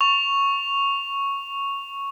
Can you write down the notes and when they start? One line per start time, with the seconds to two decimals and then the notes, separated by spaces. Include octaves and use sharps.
0.01 C#6 F7